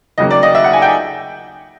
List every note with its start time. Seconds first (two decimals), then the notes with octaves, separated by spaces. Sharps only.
0.18 D#2 C#3 F#3 A#3 D#5
0.31 D5
0.43 D#5
0.55 E5
0.64 F#5
0.73 G#5
0.82 G5